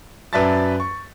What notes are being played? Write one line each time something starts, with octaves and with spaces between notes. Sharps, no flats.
F#2 B4 D5 E5 A5 A6
C#6